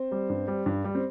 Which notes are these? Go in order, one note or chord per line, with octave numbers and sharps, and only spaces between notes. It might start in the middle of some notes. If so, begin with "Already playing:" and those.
Already playing: C4 C5
G3
G2
G3
G2
G3
C4